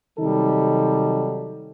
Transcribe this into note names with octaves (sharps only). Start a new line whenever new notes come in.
C3 D#3 F#3 G3 D#4 A4